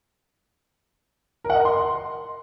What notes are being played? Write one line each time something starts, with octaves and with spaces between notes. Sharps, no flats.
A#4
F#5
D#5
A#4
C6